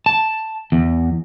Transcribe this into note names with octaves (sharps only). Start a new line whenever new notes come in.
A5
E2